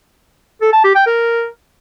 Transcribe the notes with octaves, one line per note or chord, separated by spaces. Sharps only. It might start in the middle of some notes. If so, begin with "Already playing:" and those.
A4
A5
G4
G5
A#4